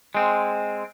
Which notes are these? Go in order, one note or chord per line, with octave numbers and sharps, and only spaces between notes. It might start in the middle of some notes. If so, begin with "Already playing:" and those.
G#3 C4